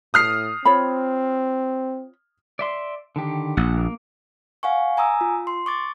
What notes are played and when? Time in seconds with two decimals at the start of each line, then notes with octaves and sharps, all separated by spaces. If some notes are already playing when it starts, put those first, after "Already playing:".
0.14 A2 D#6 F6 C7
0.65 C4 F4 C#5 B5
2.59 D5 E5 C6
3.16 D3 D#3 G4
3.57 A#1 F#5
3.77 A#3
4.63 F5 F#5 G#5 C#6
4.97 G#5 A#5 D#6 E6
5.21 F4
5.47 C6
5.66 C#6 D6 A6